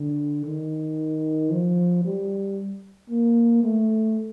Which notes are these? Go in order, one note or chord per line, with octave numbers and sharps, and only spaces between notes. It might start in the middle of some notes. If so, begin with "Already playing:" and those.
Already playing: D3
D#3
F3
G3
A#3
A3